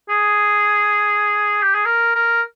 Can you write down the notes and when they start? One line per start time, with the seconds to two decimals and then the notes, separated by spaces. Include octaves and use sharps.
0.09 G#4
1.63 G4
1.75 G#4
1.85 A#4
2.15 A#4